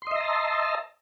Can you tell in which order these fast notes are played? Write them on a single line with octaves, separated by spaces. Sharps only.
C6 D#5 E5 A#5 A5